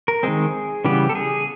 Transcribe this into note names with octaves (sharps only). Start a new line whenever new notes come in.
A#4
D#3 G#3 C4 G#4
C#3 E3 G3 B3 G4
A4
G#4